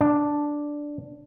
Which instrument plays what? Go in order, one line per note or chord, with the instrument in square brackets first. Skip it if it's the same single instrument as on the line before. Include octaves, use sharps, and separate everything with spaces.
[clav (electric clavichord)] D4